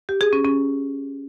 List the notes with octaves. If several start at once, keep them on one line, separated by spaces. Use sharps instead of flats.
G4
G#4
C#4
C#4